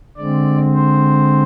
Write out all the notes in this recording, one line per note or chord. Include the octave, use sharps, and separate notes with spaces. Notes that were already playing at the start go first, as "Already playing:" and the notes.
D3 G#3 C4 D5
C5